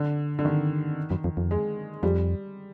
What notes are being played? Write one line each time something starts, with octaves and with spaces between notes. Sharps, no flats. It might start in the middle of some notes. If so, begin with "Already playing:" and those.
Already playing: D3
D3
D#3
F#2
F2
F2
G#3
F2 G3